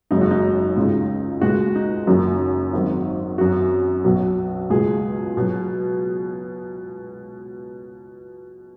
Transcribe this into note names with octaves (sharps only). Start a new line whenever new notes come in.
F#1 F#2 C#3 G#3 D#4
F#4
D#4
C#2 C#3 G#3
C#2 B2 G#3 F#4
D#4
F#1 F#2 D#3 F#3
G#1 G#2 D#3 F#3
F#2 F#3 F#4
B1 B2 F#3
C#2 B2 G#3 G#4
B2 F#3